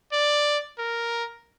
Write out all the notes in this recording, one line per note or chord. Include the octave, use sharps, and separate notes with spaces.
D5
A#4